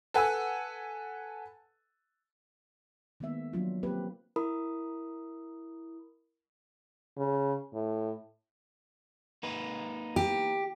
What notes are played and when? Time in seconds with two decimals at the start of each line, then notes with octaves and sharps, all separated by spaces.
0.14 A4 B4 F#5 G#5 E6
3.20 D#3 G#3 A#3 B3 E5
3.53 F3 F#3 A#3 D4 F4
3.83 A#3 C4 G4 B4
4.36 E4 A#4 B5 D#6
7.17 C#3
7.73 A2
9.43 A#3 D#4 B4
10.16 G4